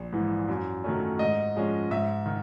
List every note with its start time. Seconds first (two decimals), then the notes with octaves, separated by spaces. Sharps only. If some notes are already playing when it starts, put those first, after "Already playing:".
Already playing: A#1
0.13 G#2 E3
0.48 F#2
0.84 D#3 F#3 A3 C#4
1.19 G#2 D#5
1.56 F3 G#3 C#4
1.91 G#2 E5
2.26 D#3